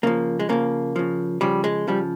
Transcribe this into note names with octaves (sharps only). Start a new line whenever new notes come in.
C#3 F3 A#3
G#3
C#3 F3 A#3
C#3 F3
C#3 F3 G3
G#3
C#3 F3 G3